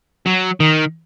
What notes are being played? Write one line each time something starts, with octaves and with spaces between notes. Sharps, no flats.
F#3
D#3